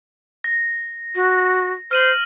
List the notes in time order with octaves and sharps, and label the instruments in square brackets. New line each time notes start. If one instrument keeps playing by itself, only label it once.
[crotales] A#6
[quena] F#4
[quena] C5 [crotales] F6 D#7 F#7